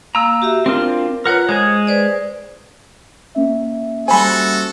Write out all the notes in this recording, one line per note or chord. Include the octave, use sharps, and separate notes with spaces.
A#3 F5 A#5 E6
F#4 G4 E5
C4 D4 F4 A#4
F4 A#4 B4 C#5 F#5
G#3 G#4 C5 G#5
B4 C5 D5
A#3 C#4 E5
G3 F#4 A4 C5 G#5 B5